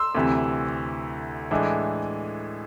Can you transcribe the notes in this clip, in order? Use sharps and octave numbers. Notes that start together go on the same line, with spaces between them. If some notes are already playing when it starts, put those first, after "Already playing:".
Already playing: C6 E6
D2 C3 E3
A2 E3 G#3 D4